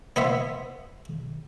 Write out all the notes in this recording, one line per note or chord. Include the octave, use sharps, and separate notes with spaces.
B3 C5 E5